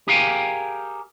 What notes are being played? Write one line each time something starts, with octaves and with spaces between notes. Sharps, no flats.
G4 G#4 A#4 F5 G5 G#5